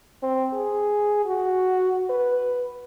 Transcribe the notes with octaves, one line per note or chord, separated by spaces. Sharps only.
C4
G#4
F#4
B4